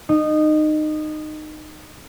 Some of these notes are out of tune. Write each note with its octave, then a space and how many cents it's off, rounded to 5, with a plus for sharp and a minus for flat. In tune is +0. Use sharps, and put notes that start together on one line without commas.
D#4 -20